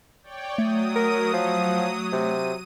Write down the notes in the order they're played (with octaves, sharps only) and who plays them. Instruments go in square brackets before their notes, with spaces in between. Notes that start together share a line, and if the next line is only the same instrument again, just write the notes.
[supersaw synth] C#5 D5 G5
[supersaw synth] F#3 D#6 [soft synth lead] A3
[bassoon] A#4
F3
[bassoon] C3 [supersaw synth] D#7